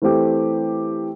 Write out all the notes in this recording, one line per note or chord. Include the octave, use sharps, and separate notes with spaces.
E3 A3 C4 G4